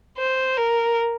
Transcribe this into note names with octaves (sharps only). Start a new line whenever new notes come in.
C5
A#4